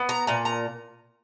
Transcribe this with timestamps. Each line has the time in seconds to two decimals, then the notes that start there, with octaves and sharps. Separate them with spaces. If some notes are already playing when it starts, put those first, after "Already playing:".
Already playing: B3
0.09 A#5
0.27 A#2 A#5
0.45 A#5